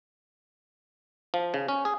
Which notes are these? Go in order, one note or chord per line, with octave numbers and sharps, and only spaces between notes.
F3
C#3
C#4
G#4